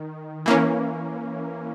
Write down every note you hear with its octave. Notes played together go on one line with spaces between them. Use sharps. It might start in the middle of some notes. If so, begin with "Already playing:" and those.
Already playing: D#3
E3 A#3 C#4